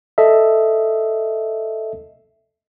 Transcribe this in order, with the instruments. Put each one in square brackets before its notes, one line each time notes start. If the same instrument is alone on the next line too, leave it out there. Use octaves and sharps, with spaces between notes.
[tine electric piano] A4 D#5 E5